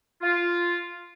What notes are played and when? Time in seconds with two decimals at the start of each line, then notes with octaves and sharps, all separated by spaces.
0.22 F4